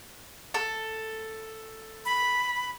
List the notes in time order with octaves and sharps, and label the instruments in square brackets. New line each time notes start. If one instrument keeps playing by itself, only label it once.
[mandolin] A4
[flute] B5